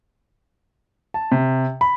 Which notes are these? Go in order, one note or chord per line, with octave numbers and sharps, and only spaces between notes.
A5
C3
B5